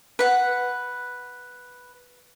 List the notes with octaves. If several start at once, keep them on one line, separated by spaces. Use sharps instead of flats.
B4 F#5